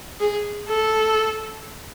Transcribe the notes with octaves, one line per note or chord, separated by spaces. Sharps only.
G#4
A4